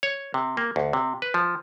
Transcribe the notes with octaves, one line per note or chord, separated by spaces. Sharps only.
C#5
C3
A#3
D2
C3
B4
F3